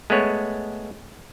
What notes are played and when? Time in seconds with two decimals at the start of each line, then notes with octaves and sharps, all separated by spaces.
0.10 G#3 A3 B3 C#5